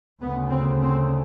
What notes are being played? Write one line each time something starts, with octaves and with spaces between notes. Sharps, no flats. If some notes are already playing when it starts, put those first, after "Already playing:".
D2 C#3 B3
C4
C4